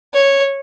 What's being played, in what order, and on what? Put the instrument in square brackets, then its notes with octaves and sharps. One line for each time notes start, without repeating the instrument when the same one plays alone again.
[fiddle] C#5